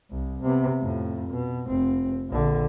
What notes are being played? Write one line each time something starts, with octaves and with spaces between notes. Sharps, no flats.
C2
C3 B3
F2 A2
B2
F1 C4
A#1 D3